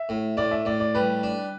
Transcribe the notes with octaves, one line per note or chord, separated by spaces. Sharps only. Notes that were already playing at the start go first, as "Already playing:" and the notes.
Already playing: E5
A2
A2 D5
E5
A2 D5
D5
G3 B4
D4